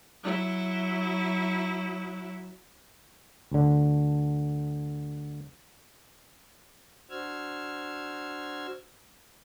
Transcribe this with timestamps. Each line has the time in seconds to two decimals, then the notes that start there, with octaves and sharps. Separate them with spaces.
0.24 F#3 E4
3.52 D2 D3
7.10 D4 F#4 C5 E6 F6 G#6